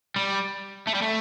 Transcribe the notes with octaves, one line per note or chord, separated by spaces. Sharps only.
G3
A3
G3
A3